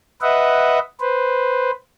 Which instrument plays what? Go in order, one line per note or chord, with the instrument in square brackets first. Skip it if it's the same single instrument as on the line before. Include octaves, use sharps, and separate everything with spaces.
[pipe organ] B4 D#5 E5 F#5
B4 C5